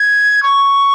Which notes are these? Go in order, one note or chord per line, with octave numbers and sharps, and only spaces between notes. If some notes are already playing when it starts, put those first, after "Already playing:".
Already playing: G#6
C#6